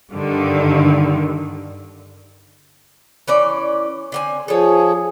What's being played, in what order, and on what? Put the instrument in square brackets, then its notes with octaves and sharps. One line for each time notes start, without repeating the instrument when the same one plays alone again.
[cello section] G2 D3 D#3
[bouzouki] E3 C#4 D5
D3 C4 G#5
[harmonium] F3 G#4 [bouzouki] A4 C#5